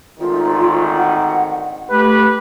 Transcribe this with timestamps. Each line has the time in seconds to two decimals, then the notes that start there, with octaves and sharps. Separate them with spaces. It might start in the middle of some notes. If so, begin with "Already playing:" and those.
0.20 G#1 D2 D#3 F4
0.96 F#5
1.90 A3 G4 B4